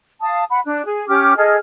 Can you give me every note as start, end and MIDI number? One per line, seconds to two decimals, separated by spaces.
0.21 0.43 77
0.21 0.43 81
0.21 0.43 87
0.51 0.60 78
0.51 0.60 83
0.66 0.86 62
0.66 0.86 90
0.86 1.08 68
1.09 1.36 61
1.09 1.36 67
1.09 1.36 86
1.09 1.36 89
1.37 1.57 68
1.37 1.57 69
1.37 1.57 75
1.37 1.57 89